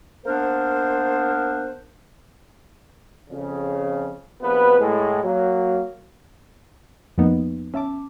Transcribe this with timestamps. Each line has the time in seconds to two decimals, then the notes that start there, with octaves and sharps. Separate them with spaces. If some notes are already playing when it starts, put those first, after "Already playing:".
0.25 A#3 B3 D4 A#4 C5
3.30 F2 C#3
4.41 A#1 C3 B3 F4 B4
4.79 A2 G#3
5.24 F#3 A#3
7.18 F2 F3 A#3 B3 D#4
7.74 C#4 E5 A5 D6